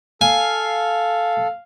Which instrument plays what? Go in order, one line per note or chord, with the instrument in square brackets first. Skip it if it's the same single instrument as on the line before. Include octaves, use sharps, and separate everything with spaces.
[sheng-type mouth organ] A4 [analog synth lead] F5 [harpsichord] G#5